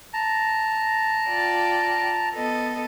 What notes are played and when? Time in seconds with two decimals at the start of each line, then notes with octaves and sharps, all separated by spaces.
0.13 A5 A#5
1.28 F4 D5 G5
2.33 B3 A4 D#5